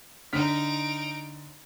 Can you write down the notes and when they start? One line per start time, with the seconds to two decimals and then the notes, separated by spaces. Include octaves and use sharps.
0.33 D3 D#4 F6 B6 D7